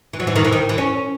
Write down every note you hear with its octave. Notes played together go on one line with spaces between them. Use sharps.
E3
F#3
E3
D#3
E3
D#3
E3
C#4